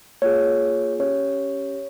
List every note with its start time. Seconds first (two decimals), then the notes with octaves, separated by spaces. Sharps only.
0.22 A#3 F4 G#4 C#5
0.99 C#4 G4 C#5